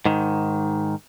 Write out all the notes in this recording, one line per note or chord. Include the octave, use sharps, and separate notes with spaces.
G#2 D#3